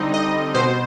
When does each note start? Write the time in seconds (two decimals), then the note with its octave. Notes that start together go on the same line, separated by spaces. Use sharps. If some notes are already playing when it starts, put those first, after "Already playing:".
Already playing: D3 G3 C4 D#4 D#5
0.14 D#5
0.54 B2 C5